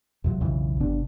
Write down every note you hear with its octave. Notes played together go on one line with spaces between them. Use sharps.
F2 C3 F#3
B1 F2 C#3 E3
G1 C3 B3 D4